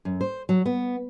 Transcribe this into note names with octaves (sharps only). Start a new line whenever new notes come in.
F#2
C5
F#3
B3